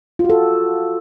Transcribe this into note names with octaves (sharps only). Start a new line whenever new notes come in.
F4
F#4
A4